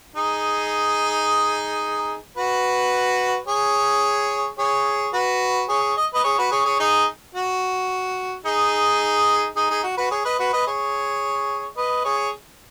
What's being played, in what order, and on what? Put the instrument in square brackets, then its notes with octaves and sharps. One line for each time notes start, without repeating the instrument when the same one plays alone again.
[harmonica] D#4 G#4
F#4 B4
G#4 C#5
G#4 C#5
F#4 B4
G#4 C#5
D#5
B4 D#5
G#4 C#5
F#4 B4
G#4 C#5
G#4 C#5
D#4 G#4
F#4
D#4 G#4
D#4 G#4
D#4 G#4
F#4
F#4 B4
G#4 C#5
B4 D#5
F#4 B4
B4 D#5
G#4 C#5
B4 D#5
G#4 C#5